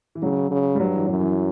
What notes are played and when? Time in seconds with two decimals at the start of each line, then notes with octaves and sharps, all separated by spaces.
0.15 E3
0.22 C#3 F#3
0.51 C#3
0.75 G3
0.80 G2 F#3
0.95 E3
1.07 F#2 F#3
1.20 E3